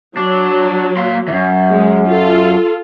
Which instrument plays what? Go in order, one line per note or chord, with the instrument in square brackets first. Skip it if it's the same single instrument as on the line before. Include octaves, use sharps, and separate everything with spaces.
[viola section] F#3 [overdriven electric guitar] D4
[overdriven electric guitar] A#3 C6
F#2 E3
[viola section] G#3
F4 A4